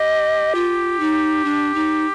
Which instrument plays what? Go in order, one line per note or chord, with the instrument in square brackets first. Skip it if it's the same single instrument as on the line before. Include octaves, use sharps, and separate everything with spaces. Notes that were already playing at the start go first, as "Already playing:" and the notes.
Already playing: [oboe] G4 [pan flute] D#5
[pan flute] F4
D#4
D4
D#4